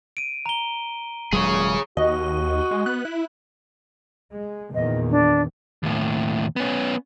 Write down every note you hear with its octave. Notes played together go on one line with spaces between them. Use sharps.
D7 D#7
A#5 G7
D#1 F#3 G#3 G#4 C#5
D#2 F#4 D#5
G#3
B3 F#6
E4
G#3
E2 A#2 D#3 D#5
D4
D#2 A2
B3 C#4